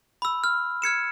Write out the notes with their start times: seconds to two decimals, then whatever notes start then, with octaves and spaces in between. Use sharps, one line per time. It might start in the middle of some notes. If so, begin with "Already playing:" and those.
0.22 B5 E6
0.44 F6
0.82 F6 G#6 C#7 E7